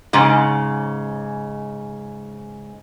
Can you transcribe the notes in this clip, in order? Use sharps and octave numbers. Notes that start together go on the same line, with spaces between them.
G#2 C#3